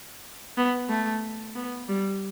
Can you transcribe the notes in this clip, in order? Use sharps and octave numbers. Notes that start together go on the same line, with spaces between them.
B3
A3
B3
G3